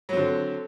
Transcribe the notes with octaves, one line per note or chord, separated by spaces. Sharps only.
D3 F#3 C4